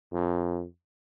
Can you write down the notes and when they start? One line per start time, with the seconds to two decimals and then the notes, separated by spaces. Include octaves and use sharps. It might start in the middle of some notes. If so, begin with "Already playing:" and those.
0.12 F2